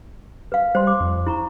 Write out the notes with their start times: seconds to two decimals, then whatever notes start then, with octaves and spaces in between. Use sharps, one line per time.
0.52 B4 F5
0.75 G3 C5 C6
0.87 D6
1.01 F2
1.27 E4 A#5 C#6